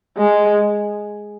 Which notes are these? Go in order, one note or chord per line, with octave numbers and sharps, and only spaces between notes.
G#3